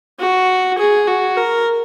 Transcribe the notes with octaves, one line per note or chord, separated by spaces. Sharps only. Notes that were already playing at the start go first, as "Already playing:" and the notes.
F#4
G#4
F#4
A#4